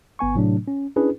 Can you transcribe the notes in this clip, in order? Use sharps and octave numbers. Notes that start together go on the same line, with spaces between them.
G1 B3 G#5 C#6
A2 C3 F#3 A3 D4
C#4
C#4 D4 E4 G#4 B4